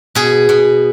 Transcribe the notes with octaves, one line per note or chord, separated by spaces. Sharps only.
B2 G#4
B2